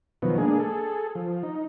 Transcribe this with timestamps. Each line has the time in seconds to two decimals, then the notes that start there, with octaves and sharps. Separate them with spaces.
0.22 B2 D#3 F3 F#3 B3
0.38 G#3 A#3 D4 G#4
0.59 G#4 A4
1.15 F3
1.43 D#4